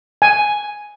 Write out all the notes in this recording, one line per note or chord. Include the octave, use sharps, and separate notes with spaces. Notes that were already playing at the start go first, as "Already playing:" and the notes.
G#5